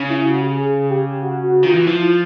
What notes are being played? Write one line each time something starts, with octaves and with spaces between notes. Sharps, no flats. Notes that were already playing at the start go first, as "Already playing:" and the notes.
Already playing: C#3
E4
F#4
G4
G#4
G4
F#4
F#4
D#3 F4
E3
F3 E4
F4